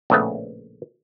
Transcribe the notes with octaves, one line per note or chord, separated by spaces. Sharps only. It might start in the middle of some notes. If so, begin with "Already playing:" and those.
A#1 A2 C#3 A3 B3